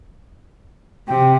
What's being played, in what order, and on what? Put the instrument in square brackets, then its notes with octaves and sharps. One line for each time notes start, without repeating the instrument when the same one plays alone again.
[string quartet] C3 [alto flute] G5